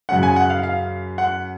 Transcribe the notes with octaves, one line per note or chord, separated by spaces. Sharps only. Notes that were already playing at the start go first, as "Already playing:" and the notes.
F#2 C#3 F#5
G#5
F#5
F5
F5
F#5